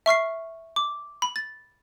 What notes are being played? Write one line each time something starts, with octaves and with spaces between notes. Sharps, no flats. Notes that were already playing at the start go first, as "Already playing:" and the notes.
E5 C#6 F6 C7
D6
B5
A6